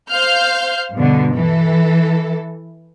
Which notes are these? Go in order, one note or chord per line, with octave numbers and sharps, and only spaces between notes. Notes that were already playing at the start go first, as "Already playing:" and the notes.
C5 F5 F6 G6
G2 B2 D3
E3 A4